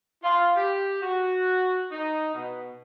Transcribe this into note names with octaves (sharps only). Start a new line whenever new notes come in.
F4
G4
F#4
D#4
B2